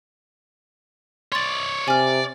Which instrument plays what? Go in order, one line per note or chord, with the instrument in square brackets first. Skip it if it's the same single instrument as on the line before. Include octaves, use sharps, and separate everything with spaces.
[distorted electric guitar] C#5 D5 [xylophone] C6 A6
[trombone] C3 [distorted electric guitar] D5 [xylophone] G#5 F6